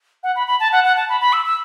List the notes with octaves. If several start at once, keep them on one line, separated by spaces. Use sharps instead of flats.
F#5
B5
B5
A5
F#5
F#5
A5
B5
B5
E6
E6